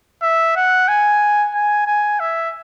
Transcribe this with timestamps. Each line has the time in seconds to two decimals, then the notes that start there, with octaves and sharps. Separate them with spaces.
0.22 E5
0.56 F#5
0.88 G#5
1.55 G#5
1.87 G#5
2.20 E5